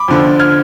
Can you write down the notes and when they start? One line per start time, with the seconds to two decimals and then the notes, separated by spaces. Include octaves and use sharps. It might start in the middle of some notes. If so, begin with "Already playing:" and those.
Already playing: B5 D6
0.08 F2 D3 F3
0.39 F6 G#6